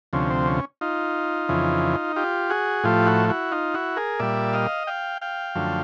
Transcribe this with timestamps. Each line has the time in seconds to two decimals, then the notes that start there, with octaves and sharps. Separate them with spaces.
0.13 D2 C3 F3 C#4
0.30 C4
0.47 C#4
0.81 D#4 F4
1.49 F2 C#3 E3
2.16 F4 G4
2.50 F#4 G#4
2.83 A2 F3 A3 F4 G4
3.06 E4 F#4
3.29 E4 F#4
3.52 D#4 F4
3.74 E4 F#4
3.96 G#4 A#4
4.19 A#2 G3 D5 E5
4.53 D#5 F5
4.87 F5 G5
5.21 F5 G5
5.55 F#2 D3 F3 A3